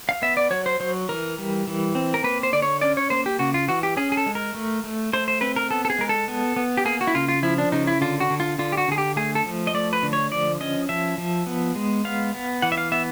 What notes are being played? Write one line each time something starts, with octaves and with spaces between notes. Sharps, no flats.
F5
B3 E5
D5
F#3 C#5
C5
F#3 C5
E3 A#4
G3
E3
C4
A#4
A#3 B4
C5
D3 D5
C#5
C#4 D5
C#5
A#3 C5
G4
C#3 F#4
F4
E3 F#4
G4
C#4 G#4
G#4
A4
G#3
A#4
A3
A3
A3 C5
C5
C4 B4
A#4
B3 A4
A4
G#4
G#3 A#4
A4
B3
B3
G4
A#3 G#4
F#4
E4
C#3 F4
F4
F3 E4
D4
C#3 D#4
E4
D3 F4
F#4
D3
F4
D3 F4
G4
F#4
D3 G#4
G4
A3 G#4
A4
F3
D#5
A3 D5
B4
D3
C#5
F3 D5
C#4 D#5
F3 E5
F3
B3
G#3
B3 F5
B3
E3 F#5
E5
F5
B3 E5